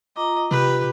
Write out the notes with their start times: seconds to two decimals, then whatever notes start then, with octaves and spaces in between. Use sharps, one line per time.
0.16 F4 D#5 A#5 D6
0.51 C3 F4 G4 B4